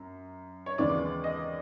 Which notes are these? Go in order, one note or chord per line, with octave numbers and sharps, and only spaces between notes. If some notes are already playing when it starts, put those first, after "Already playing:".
Already playing: F#2
C#5
D#2 C#3 E3 G#3 B3 D5
D#5